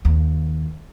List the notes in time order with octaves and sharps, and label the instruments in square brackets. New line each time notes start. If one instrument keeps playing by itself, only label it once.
[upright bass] D#2